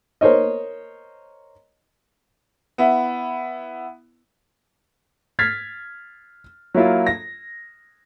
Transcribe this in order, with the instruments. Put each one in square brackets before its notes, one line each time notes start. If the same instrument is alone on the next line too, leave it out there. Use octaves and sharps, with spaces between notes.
[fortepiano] A#4 C5 C#5 D#5
[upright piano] B3 E4
F6 G#6 A6 B6 C7
F#3 A#3 E4 F4
A#6